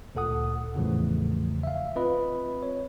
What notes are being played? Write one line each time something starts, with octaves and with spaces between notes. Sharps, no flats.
D2 A#2 A4 F#5 D#6
E2 A2 C#3 E3 F3 A3
E5 F5
C4 F4 B4 D#5 B5
C#5